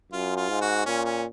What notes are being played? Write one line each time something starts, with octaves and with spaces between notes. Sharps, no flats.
F#2 F4
F4
G#2
F#4
A#2 C#4
C#4